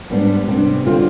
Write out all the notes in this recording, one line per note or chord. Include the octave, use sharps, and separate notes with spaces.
G#2 G3 B3 D4
C3 G3 B3 D4
D3 G3 C4 F4